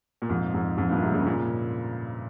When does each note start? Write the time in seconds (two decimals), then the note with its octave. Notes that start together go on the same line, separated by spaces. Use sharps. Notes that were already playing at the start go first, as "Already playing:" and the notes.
0.22 A#2
0.29 F2 G#2
0.54 F2 G#2
0.77 F2 G#2
0.89 G2 A#2
1.02 G#2 C3
1.13 A#2 C#3
1.26 A#2 C#3